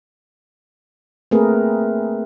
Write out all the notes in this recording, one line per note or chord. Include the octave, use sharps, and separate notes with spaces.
A3 A#3 C4 G#4 A#4 B4